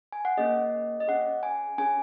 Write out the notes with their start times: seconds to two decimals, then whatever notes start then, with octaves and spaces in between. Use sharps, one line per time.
0.12 G#5
0.25 F#5
0.38 A#3 C#4 G#4 D#5
1.00 D#5
1.08 C#4 G#4 F#5
1.43 G#5
1.78 C#4 G#4 G#5